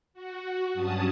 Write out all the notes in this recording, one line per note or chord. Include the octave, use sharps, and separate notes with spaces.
F#4
G2 F#3 C#4 A5 D#6